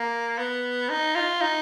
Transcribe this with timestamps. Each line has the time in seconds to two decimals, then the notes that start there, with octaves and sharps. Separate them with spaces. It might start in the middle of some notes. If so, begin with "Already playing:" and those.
Already playing: A#3
0.39 B3
0.89 D#4
1.15 F4
1.41 D#4